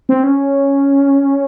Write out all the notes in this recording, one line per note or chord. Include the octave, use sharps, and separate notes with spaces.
C4
C#4